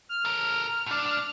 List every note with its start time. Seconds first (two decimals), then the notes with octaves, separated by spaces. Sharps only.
0.09 F6
0.25 A4 A#4
0.86 A2 D4